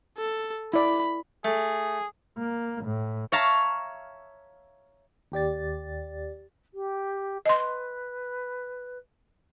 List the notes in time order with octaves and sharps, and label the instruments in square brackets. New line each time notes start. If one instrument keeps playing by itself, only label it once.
[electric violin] A4
[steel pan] E4 D5 [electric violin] B5
[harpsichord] A3 [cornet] G#4
[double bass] A#3
A2
[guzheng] C#5 E5 F5 A5 A#5
[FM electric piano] D#2 G4 D5 A6
[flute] G4
[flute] B4 [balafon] D#5 C6